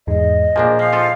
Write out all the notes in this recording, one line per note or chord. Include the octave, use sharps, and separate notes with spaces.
E2 G#2 G#3 D#5
A#2 F3 A#3 D4 G#4 G#5
F3 F5
F3 F4 A4